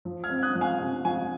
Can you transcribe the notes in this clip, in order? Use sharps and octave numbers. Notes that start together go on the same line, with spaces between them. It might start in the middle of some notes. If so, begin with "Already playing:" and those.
F3
F6 G#6
C4
D#6 F#6
F3
F5 G#5
C3
F3 F5 G#5